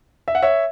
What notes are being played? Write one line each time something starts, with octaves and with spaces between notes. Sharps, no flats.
E5
F#5
C#5 E5